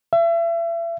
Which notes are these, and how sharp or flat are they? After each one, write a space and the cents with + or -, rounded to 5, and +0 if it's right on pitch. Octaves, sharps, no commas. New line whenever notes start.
E5 +35